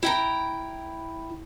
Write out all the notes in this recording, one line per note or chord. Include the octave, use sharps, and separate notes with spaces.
E4 G5 A#5